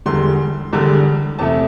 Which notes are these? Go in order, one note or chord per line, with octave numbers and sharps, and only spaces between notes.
E1 E2 D3 G3 C6
E1 E2 D3 G3
E2 C3 A3 E4 A5